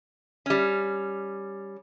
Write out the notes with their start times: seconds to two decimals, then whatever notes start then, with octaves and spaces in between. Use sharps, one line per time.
0.46 G3 C#4